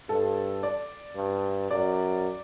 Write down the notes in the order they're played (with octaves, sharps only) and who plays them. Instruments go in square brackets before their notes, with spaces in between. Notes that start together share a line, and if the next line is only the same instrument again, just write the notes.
[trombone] G2 [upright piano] A4
[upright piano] D5
[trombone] G2
[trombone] F#2 [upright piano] D5